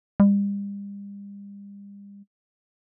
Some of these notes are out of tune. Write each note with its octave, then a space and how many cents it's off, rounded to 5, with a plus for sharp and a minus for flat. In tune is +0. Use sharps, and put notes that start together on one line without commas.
G3 +40